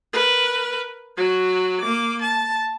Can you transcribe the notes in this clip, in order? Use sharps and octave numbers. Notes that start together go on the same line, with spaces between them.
A#4 B4
F#3 F#4
A#3 D6
A5